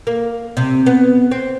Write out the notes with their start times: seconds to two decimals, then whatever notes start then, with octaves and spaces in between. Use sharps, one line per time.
0.07 A#3
0.57 C3
0.86 B3
1.31 C4